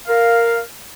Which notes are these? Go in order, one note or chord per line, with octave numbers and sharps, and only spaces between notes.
A#4 F5